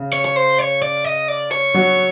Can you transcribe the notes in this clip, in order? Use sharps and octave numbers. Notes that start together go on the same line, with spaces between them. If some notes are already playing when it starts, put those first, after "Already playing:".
Already playing: C#3
C#5
C#5
C5
C#5
D5
D#5
D5
C#5
F#3 F#4